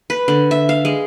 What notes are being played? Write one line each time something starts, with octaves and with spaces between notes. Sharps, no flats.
B4
D3
E5
F5
G#3